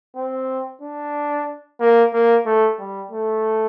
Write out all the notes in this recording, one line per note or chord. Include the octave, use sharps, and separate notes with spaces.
C4
D4
A#3
A#3
A3
G3
A3